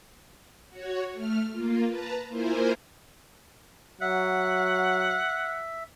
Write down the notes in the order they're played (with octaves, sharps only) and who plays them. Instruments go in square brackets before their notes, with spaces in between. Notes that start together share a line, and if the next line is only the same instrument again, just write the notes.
[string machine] F#4 C#5
A3 F6
A#3 F4
B4 A5 A#5
A#3 E4 F4 A#4 C5 G#5
[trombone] F#3 [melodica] E5 [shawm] F#5